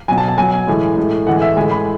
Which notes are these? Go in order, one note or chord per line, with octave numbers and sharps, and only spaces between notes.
B2 F#3 G#5
A5
A5
B2 F#3 G#5
A2 E3 G#3
A2 G#3
A2 E3 G#3 F#5
E5
A2 E3 G#3 G#5
B5